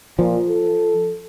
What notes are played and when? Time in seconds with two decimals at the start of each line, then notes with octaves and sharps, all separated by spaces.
0.19 A#2 F3
0.48 A4